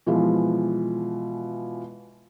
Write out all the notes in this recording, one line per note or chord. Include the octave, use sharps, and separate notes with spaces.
B2 E3 F3 G#3